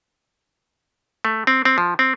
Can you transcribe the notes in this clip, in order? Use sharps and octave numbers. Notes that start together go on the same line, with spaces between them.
A3
C4
C4
F3
C4